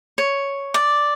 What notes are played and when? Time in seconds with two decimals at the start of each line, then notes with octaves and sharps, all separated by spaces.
0.18 C#5
0.74 D5